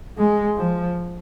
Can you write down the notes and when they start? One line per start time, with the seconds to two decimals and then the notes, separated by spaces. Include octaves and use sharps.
0.18 G#3
0.57 F3